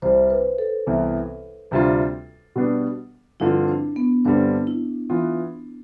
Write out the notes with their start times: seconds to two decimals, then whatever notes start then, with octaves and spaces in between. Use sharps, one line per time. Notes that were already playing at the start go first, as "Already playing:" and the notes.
0.02 C2 C3 G3 C5
0.30 B4
0.59 A4
0.87 C2 C3 E3 B3
1.71 D2 C3 G3 D4 F4
2.56 B2 G3 B3 D4
3.40 G2 D3 F3 C4 E4 F4
3.68 D4
3.96 B3
4.25 G2 D3 G3 C4 D4
4.67 E4
5.10 E3 B3 F4